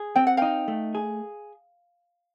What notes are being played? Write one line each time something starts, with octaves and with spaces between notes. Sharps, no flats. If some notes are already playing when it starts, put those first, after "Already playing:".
Already playing: G#4
C4 G5
F#5
D#4 F5 G5
A3
G#4